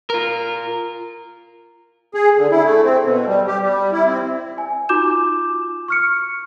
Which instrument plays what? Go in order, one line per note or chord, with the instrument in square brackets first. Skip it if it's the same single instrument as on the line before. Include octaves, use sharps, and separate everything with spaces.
[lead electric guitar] F4 A#4
[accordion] G#4
D3
E4
A3
C4
B2
G3
G4
G3
E4
C4
[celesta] G#5
D#4 F4 F#4 D6 G6 E7
C#6 F6 C#7